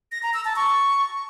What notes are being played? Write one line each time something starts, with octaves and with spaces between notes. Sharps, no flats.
A#6
A#5
E6
A5
C#6